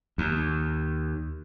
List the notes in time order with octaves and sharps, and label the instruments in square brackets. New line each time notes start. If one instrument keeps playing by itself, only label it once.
[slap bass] D#2